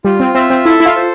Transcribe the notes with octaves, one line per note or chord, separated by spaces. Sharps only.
G3 F4
C4
C4 E5
C4
E4 A4
E4
F4
C5